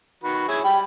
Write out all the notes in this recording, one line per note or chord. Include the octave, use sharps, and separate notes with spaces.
D#3 F#4 B4
E4 G#4 C#5
G3 G5 B5